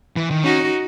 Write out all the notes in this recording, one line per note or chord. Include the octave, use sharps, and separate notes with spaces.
E3
D#3
C#4 D#4 F#4